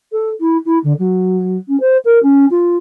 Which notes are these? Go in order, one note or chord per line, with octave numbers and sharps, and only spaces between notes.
A4
E4
E4
D3
F#3
C#4
C5
A#4
C#4
F4